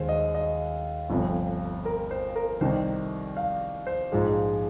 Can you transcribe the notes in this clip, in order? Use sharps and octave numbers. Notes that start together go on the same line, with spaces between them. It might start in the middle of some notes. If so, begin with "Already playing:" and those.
Already playing: D#2 D#3 G#3 C5
D#5
D#5
G1 F2 C3 F3
A#4
C5
A#4
C2 C3 D#3 C5
F5
C5
A#1 G#2 F3 G#3